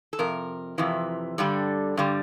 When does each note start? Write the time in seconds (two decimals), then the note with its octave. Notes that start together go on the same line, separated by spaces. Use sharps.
0.13 A4
0.19 F2 C3 A#4
0.78 F2 C3 E3
1.38 G2 D3 G3 A4
1.97 G2 D3 G3